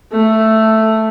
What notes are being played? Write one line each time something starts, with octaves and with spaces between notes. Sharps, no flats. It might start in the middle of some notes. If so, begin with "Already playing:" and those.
A3